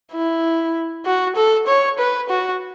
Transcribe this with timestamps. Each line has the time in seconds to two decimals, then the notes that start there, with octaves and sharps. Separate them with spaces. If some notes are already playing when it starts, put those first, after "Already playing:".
0.12 E4
1.05 F#4
1.35 A4
1.67 C#5
1.98 B4
2.29 F#4